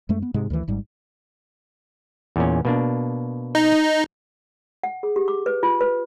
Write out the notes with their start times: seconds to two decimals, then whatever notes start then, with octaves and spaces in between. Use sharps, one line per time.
0.09 F#2 G#3 A3
0.22 B3
0.34 G#2 C3 G#3
0.50 D2 D#3 E3
0.68 G#1 G#2 G3
2.36 E2 A#2 C#4
2.65 B2 A#3 D4
3.55 D#4
4.84 F#5
5.03 G#4
5.16 G4
5.28 D6
5.46 B4
5.63 F4
5.81 B4